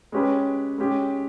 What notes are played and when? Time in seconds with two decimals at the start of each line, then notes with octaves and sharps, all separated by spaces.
0.12 G#3 C#4 G4 B4
0.78 G#3 C#4 G4